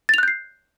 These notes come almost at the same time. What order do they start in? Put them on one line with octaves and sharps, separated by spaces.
A6 F7 F#6 G6 C7